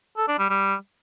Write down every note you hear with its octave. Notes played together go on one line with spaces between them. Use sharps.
A4
D4
G3
G3